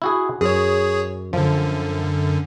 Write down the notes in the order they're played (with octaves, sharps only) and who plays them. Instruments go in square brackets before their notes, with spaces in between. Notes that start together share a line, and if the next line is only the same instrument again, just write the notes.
[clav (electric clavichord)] E4 F#4 G#4
[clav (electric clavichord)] F#2 [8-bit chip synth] G#4 C#5
[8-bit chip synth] F#2 D3 [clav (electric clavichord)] F3